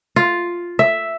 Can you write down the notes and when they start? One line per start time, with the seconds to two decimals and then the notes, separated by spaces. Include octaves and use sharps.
0.16 F4
0.79 E5